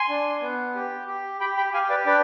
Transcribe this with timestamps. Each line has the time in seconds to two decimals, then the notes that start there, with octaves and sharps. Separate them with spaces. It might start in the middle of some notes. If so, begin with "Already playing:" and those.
Already playing: G#5 C6
0.09 D4
0.41 B3
0.75 G4
1.08 G4
1.40 G4 G5 B5
1.57 G5 B5
1.73 G4 F5 G#5
1.90 B4 D5
2.06 D4 B4 D5